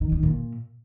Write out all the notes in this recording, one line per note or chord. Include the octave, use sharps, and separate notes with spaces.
D#3
D#3
A#2